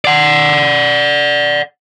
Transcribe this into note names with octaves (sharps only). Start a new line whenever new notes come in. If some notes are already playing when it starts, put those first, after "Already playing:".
D5 F#5